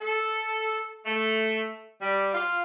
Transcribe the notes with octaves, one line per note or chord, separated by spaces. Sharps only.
A4
A3
G3
F4